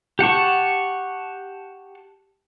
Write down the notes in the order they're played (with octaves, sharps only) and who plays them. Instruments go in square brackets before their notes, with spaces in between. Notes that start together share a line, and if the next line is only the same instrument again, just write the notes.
[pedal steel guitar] G4 F#5 A5 C#6